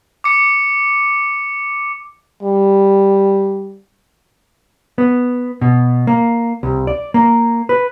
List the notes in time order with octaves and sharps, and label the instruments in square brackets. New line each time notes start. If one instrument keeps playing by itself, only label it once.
[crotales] D6 C#7
[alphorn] G3
[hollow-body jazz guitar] B3
B2
A#3
C2
D5
A#3
B4